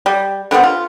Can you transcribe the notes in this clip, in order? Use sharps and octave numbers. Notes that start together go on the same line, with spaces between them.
G3
D3 G3 B3 C4
F4